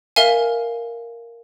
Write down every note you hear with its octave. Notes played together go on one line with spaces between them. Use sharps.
A#4 E5 F5 G#5